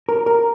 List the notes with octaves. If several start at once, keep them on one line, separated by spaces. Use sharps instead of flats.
A#4
A#4